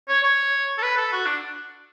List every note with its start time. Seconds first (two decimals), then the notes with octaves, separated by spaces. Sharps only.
0.08 C#5
0.24 C#5
0.78 A4
0.83 B4
0.97 A4
1.12 F#4
1.26 D4